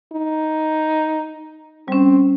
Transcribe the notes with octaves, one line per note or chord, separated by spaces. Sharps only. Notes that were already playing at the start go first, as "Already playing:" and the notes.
D#4
G3 C4 C#4